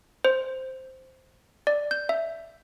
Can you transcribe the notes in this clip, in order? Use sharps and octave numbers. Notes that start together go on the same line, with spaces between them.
C5
D5
G6
E5